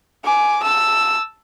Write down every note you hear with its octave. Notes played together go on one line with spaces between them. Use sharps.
G#5 D6
A5 E6